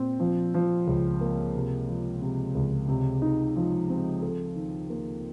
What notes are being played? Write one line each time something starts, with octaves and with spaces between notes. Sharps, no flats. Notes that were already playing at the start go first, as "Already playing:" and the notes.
Already playing: A#2 C4
F3
F3
C#2
A#3
C3
F3
C3
C#2
C3
D#4
F3
C4
A4
D#3
A#3